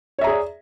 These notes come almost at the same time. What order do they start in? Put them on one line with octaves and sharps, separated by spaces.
C#5 E5 A#5 G#4 D5